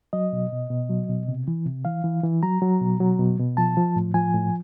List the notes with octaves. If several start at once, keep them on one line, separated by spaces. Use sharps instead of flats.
F#3 D#5
B2
B2
B2
F#3
B2
C3
E3
C3
E3 F5
E3
E3
F#3 A#5
F#3
B2
F#3
B2
B2
F3 A5
F3
A2
F3 G#5
A2